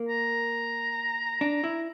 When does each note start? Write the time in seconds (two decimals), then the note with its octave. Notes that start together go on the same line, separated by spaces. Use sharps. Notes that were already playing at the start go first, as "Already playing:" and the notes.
Already playing: A#3
0.09 A#5
1.41 D4
1.64 E4